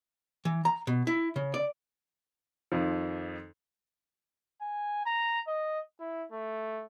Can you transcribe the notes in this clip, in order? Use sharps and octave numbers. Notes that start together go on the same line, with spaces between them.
E3
A#5
B2
E4
C#3
D5
F2 D#3 F3
G#5
A#5
D#5
E4
A3